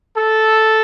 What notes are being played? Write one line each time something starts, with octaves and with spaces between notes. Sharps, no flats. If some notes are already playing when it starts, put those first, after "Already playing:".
A4